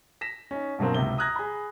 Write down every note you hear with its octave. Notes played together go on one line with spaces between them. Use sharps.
A#6 B6 E7
C#4 D#4
G2 B2 F#3 A#3 C4
C#2 C3 G7
A#5 D#6 F6 F#6 G#6 A#6
G#4 B5